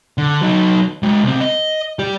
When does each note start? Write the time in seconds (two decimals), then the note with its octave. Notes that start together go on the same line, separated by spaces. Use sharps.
0.18 D3
0.41 F#3 D#4
1.03 G#3 F#4
1.24 C2 C4
1.41 D#5
1.99 G4 D5